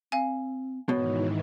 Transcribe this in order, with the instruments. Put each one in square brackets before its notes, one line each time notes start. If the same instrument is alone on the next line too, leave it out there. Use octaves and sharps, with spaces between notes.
[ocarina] C4 [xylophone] F5 G#5
[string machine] G#2 D#3 E3 [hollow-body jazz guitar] B2 [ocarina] C#5